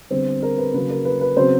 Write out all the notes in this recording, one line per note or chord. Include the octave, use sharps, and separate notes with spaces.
D3 G3 B3 C4 C5
A#4
B4
C#3 F#3 A#3 C#4 B4
A#4
B4
B4
C#3 F#3 B3 C4 C5